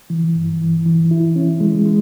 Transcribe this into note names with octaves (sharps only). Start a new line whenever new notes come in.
E3
G2
E3
E3
E4
C#4
G#3
G#3